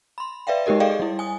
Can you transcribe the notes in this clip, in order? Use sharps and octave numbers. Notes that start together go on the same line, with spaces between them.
B5 C6
B4 D5 E5 F5 G5
G#3 D#4 G4 A#4 D#5
G#4 A4 D5 D#5 F5 G5
G3 E4
G#5 D#6